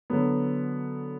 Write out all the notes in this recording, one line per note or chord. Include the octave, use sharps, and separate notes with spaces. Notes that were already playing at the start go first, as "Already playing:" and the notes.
D3 F#3 B3